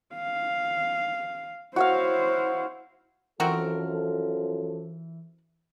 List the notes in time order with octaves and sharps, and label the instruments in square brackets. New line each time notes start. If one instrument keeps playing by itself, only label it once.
[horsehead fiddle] F5
[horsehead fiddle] E4 C5 [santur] F#4 C#5 F5
[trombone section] F#2 F3 A4 [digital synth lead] E3 [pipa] C4 F#4 A#4